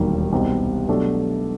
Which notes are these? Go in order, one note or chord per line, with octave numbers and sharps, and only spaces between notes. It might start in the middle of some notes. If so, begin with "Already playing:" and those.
Already playing: E1 D#2 D#3 G3 A#3
C2 B2 G3 C4 D#4
B2 F#3 A3 D4